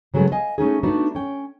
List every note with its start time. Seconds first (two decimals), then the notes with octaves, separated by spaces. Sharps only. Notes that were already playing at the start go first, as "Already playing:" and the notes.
0.14 C#3 F#3 G#3 A3 B3
0.32 D#5 F5 G#5
0.58 A3 C#4 D#4 G#4
0.83 A3 B3 D4 D#4 F#4
1.15 C#4 G5